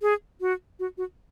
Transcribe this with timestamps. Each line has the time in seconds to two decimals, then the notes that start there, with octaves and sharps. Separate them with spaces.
0.02 G#4
0.41 F#4
0.79 F#4
0.98 F#4